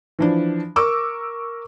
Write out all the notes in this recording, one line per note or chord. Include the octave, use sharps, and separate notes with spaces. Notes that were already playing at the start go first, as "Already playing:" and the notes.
E3 F3 D4
A#4 C#6 D6 E6